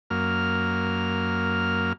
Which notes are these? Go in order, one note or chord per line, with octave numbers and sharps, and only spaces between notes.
F#2 A#3 F6